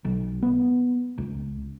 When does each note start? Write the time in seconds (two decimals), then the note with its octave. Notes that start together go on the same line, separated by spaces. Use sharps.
0.05 B1
0.43 B3
1.18 C#2